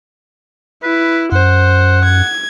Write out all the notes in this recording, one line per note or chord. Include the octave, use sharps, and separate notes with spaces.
E4 B4
F#2 C5 F#5
G#6